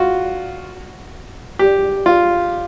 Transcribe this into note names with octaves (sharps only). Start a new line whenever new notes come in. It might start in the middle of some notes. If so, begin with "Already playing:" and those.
Already playing: F4 F#4
G4
F4